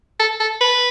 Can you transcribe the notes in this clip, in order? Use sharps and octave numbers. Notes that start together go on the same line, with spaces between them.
A4
A4
B4